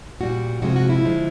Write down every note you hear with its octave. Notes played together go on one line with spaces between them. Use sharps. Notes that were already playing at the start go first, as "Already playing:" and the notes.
A#2 G3 F#4
C3 F3 G#3 F#4
F#4
E4
D3 F3 G#3